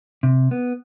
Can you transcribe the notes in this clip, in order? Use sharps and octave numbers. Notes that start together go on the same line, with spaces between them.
C3
B3